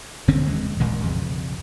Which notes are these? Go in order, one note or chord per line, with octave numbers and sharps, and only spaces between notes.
F1 D3 C4 C#4
D#2 E3 G#3
A1 A#2 D#3 G#3
B1 F2 C#3